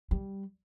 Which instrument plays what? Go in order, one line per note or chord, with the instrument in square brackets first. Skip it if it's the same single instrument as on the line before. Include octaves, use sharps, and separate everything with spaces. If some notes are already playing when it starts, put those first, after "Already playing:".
[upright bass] G3